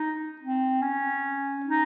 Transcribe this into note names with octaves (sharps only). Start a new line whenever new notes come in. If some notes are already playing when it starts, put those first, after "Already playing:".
Already playing: D#4
C4
C#4
D#4